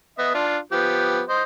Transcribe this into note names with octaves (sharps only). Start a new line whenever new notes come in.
B3 D#5 E5
D4 F4
F3 B3 G4
C5 D#5